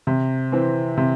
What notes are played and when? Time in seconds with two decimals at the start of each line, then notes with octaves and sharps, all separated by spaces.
0.07 C3
0.52 E3 C4
0.97 C3